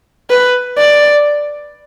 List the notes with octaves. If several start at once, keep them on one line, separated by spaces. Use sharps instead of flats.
B4
D5